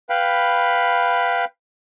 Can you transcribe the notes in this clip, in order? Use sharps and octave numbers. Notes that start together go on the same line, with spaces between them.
B4 F5 G5 B5